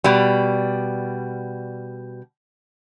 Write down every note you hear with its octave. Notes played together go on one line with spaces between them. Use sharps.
B2 G3